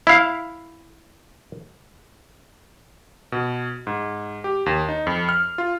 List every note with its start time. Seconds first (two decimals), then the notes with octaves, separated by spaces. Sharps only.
0.07 E4 F5
3.32 B2
3.87 G#2
4.44 G4
4.66 D#2
4.89 D#4
5.07 F2
5.29 F6
5.58 F4